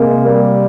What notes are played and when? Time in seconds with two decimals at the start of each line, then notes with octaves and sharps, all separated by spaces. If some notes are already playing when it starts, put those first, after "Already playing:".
Already playing: C3 G#3 A#3
0.24 G3 A#3